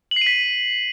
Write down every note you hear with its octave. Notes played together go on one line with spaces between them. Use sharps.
F#7
C7
D#7
B6